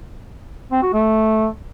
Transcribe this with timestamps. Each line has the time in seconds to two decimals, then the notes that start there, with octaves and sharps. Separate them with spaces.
0.72 C4
0.83 F#4
0.94 A3